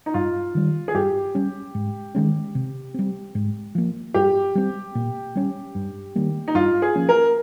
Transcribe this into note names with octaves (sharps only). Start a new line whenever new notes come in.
D#4
G2 F4
D#3 G3
G#4
G2 G4
G3 C#4
G#2
D#3 G#3 C#4
C3
G3 C4
G#2
F3 A#3
G2 G4
G3 C4
A#2
G3 C#4
G2
D#3 G3 A#3
D#4
G2 F4
G#4
F3 A#3 C#4
A#4